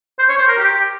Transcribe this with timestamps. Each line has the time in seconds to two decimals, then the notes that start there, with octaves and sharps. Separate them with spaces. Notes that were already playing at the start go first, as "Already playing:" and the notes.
0.19 C5
0.29 C#5
0.38 C5
0.48 A#4
0.58 G4